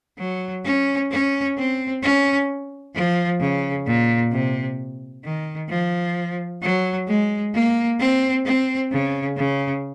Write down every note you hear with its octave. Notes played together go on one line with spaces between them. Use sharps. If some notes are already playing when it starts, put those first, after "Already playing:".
F#3
C#4
C#4
C4
C#4
F3
C#3
A#2
C3
D#3
F3
F#3
G#3
A#3
C4
C4
C#3
C#3